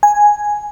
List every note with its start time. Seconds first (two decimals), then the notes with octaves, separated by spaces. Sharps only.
0.03 G#5